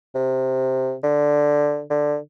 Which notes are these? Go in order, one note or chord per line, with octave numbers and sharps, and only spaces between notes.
C3
D3
D3